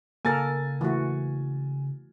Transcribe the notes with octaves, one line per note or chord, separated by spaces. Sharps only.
C#3 A#3 A4 A#4 G#5 A6
E3 A3 F#4